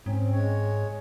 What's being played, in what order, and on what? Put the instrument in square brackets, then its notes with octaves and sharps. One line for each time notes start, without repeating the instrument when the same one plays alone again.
[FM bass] G#2 [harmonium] C4 C#4
[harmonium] G#3 C#5